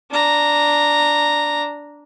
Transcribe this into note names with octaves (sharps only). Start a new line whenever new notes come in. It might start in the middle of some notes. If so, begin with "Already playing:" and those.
D4 A#5